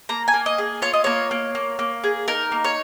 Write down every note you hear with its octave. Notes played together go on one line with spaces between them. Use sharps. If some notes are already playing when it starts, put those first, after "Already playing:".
A#3 A#5
G#5
A#3
D#5
G#4
F4 C#5
D#5
A#3 C#5
A#3
A#3
A#3
G#4
D#4 A#4
A#3
C#5